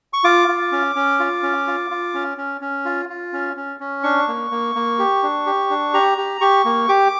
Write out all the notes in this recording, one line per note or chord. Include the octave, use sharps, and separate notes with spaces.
C#6
F4 D6
F4
C#4
C#4
F4
C#4
F4
F4
C#4
C#4
C#4
F4
F4
C#4
C#4
C#4
D4 C#6
A#3
A#3
A#3
G4
D4
G4
D4
G4 A#5
G4
G4 C#6
A#3
G4 D6